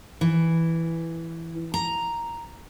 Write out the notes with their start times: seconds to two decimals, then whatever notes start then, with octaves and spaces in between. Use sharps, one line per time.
0.21 E3
1.74 A#5